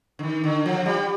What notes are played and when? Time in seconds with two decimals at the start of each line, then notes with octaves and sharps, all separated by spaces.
0.19 D3
0.23 D#3
0.44 D3
0.66 F3
0.86 G3